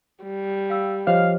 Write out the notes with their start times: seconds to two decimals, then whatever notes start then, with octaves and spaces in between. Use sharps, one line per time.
0.23 G3
0.70 F5 G5 E6
1.07 F3 G4 C5 C#5 D#5 F5 F6